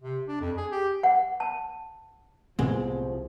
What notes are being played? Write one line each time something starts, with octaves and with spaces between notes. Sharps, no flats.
C3
D4
F2
G#4
G4
F#5
A5
C2 A2 F3 G#3 B3 C4